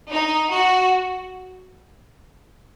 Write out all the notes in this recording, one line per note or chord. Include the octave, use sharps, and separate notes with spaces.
D#4
F#4